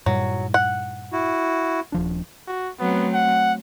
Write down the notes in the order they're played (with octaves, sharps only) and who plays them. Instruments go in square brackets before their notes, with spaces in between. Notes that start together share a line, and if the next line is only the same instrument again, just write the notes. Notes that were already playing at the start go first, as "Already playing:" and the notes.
[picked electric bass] G2 A#2 G3 [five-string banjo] F#3
[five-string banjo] F#5
[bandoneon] E4 F#4
[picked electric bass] D#1 F3 D4
[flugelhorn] F#4
[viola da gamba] F#3 A3 C4 [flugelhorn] B3
[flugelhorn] F#5